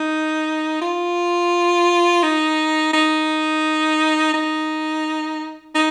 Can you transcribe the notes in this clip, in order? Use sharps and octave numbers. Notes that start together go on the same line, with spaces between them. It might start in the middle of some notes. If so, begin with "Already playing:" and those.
Already playing: D#4
F4
D#4
D#4
D#4
D#4